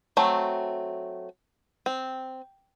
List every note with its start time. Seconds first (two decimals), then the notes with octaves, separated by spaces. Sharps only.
0.17 F#3 A3 C4
1.86 C4